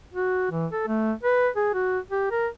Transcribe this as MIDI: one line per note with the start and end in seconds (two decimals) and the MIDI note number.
0.13 0.49 66
0.51 0.67 52
0.72 0.84 69
0.87 1.13 57
1.23 1.49 71
1.56 1.71 68
1.74 1.99 66
2.11 2.28 67
2.31 2.48 70